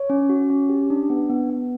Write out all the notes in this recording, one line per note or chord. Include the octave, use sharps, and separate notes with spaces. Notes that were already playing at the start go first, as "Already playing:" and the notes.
Already playing: C#5
C#4
F#4
C#4
G4
D4
B3
B3
B3